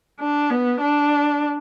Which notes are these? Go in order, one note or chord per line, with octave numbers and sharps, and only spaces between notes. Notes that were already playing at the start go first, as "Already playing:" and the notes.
D4
B3
D4